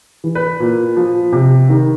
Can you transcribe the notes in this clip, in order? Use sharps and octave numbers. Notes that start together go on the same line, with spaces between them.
E3
B4
A#2
F3
C3
D#3